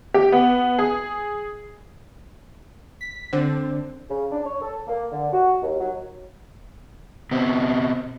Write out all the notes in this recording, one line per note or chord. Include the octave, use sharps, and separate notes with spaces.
G4
B3
G#4
B6
D3 C4
C#3
D4
C#5
A4
A#3
D3
F#4
D#2
F#3
B2 C4